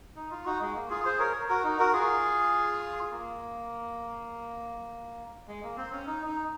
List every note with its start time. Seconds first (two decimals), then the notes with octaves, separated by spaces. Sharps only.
0.16 D#4
0.31 F4
0.46 D#4 F#4
0.61 G#3
0.76 A#3
0.90 F4 G#4
1.05 G#4 C5
1.20 A#4 C#5
1.49 F#4 A#4
1.64 D#4
1.79 F#4 A#4
1.93 F4 G#4
3.12 A#3
5.48 G#3
5.63 A#3
5.77 C4
5.92 C#4
6.07 D#4
6.26 D#4